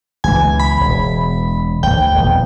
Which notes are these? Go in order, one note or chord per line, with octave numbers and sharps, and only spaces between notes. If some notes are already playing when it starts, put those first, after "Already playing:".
C#2 B2 E3 G#5
B5
E1
D2 G5
D#1 F2 B3